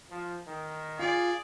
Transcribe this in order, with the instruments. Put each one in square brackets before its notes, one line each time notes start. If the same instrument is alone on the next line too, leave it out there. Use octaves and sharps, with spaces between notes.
[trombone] F3
D#3
[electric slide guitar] F4 [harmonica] G#4 D5